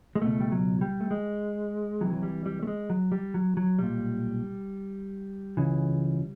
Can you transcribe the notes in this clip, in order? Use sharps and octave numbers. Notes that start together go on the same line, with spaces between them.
G#3
C#2 B2 A3
G3
F#3
G3
A3
G#3
C2 C3 E3 F#3
F#3
G3
G3
A3
G#3
F#3
G3
F#3
F#3
B1 A#2 G3
C#2 C#3 E3